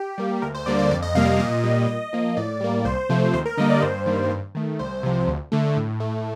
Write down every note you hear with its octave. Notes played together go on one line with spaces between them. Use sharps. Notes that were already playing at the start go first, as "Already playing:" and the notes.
Already playing: G4
G3 A#3
D2 A#4
C5
D3 G3 A#3 D5
D5
F2 D5
D#5
C3 G3 A#3 F5
F5
A#2 D#5
G3 A#3
A#2 D#5
F3 A#3
A2 D5
G3 A#3
C2 C5
C3 F3 A3
D#2 C5
A#4
D3 G3 A#3 D#5
D5
G2 C5
D#3 G3 A#3
G2
D#3 A3
C2 C5
C3 F3
D2
D3 A3
A2
A3